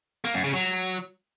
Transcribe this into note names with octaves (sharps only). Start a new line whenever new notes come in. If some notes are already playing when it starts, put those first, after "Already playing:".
A#3
F#2
C#3
F#3